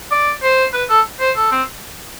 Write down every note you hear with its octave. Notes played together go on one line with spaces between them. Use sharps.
D5
C5
B4
A4
C5
A4
C4